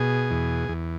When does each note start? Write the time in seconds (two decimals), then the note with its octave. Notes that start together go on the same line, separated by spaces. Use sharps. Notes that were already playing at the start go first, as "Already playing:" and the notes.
Already playing: B2 G#4
0.31 E2
0.69 E2